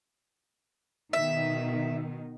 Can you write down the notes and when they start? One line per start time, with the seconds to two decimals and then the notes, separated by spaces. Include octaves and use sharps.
1.13 B2 D#3 E5